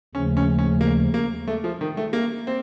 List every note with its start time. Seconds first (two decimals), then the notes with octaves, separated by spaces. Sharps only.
0.15 D#2 C#3 F3 A3 C#4
0.37 C#4
0.59 C#4
0.81 A#3
1.14 A#3
1.48 A3
1.64 F3
1.81 D#3
1.97 A3
2.13 A#3
2.47 C4